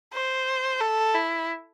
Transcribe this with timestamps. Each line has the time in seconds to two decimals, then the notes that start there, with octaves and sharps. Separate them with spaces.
0.14 C5
0.81 A4
1.14 E4